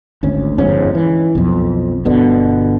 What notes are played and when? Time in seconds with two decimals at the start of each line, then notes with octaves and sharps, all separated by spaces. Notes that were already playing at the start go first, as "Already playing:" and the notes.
0.23 G#1 D2 C#4
0.58 G1 F2 G#2 C#4
0.95 E3
1.35 B1 F2
2.05 G1 B2 D3